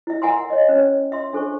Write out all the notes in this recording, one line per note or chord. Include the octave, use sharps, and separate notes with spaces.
E4 E5
A#4 E5 F#5 G#5 A#5 C6
C#5 D#5
C#4 C#5
E5 C6
D4 A4 C5 C#6